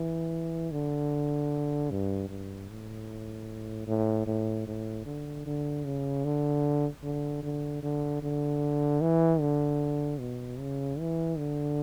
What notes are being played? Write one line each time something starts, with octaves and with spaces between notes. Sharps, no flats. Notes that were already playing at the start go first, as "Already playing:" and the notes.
Already playing: E3
D3
G2
G2
A2
A2
A2
A2
D3
D3
C#3
D3
D3
D3
D3
D3
E3
D3
B2
C#3
E3
D3